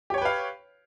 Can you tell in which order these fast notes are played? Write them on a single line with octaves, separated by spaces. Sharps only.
G4 C#5 G5 B4 F5